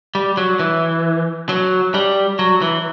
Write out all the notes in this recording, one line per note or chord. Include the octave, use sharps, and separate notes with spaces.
G3
F#3
E3
F#3
G3
F#3
E3